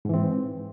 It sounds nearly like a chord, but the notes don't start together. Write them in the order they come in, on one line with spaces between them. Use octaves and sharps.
G#2 E3 C4